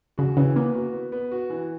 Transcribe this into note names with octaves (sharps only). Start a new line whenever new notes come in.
C#3 F#4
C#3 E3
A#3 B3
F#4
B3
B3
F#4
E3